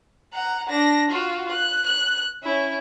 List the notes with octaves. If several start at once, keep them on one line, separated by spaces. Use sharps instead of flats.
F#5 A#5
D4 A#6
F4 F#4
F#6
F#6
C#4 E4